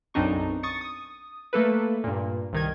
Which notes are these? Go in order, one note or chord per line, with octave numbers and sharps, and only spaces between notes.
B1 F#2 C4 D4 D#4 C#6
C#6 D#6 A6 C#7
D#6
A3 A#3 A4 B4
G2 A#2
C2 D#3 G#6